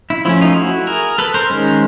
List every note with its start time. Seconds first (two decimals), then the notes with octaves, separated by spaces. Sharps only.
0.10 E4
0.25 F3 A3 C#4 E4
0.41 D#4 F4
0.56 E4 F#4
0.87 G#4 A#4
1.18 A4 B4
1.34 A#4 C5
1.50 D#3 G#3 C#4